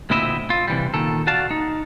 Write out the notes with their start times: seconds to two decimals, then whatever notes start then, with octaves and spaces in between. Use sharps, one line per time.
0.10 D2 A#2 C4 E4 D#5 E5
0.50 F4
0.68 C3 E3 G3
0.94 A#2 D#3 A4
1.27 F#4 D5 F5 A5
1.51 D#4